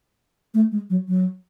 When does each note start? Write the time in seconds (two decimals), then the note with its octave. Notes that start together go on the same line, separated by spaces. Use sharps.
0.54 A3
0.72 G#3
0.90 F#3
1.08 F#3